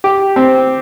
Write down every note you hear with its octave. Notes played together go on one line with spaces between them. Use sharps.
G4
C4